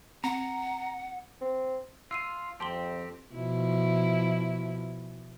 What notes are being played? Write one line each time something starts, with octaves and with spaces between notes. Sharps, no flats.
C4 F#5 A#5
C4
F4 E6 C7 D#7
F2 C4 G4 A5 C6 G7
B2 F3 E4